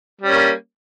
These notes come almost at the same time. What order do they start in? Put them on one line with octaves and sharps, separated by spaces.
G3 C#4 A#3